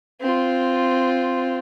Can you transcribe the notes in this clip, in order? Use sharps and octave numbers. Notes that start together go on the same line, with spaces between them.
C4 F4